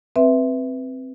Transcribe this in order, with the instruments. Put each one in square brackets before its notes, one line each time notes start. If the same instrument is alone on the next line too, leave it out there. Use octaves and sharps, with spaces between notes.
[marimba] C4 B4 E5